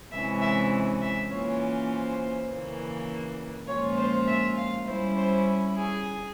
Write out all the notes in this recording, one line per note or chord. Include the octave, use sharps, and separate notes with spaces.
C3 E3 G#3 C#4 E4 E5
E5
E5
E3 A#3 C#4 F4 C#5
C5
C#3 E3 A#3
A#2 F3 G#3 C#4 F4 C#5
C5
E5
F5
G3 C#4 E4 C5
C5
G#4